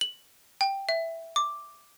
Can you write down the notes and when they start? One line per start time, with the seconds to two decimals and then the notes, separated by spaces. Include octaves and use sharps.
0.01 F#7
0.61 G5
0.89 E5
1.36 D6